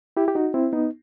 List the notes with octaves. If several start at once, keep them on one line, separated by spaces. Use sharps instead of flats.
E4 G4
G4
D#4 F#4
C4 E4
B3 D#4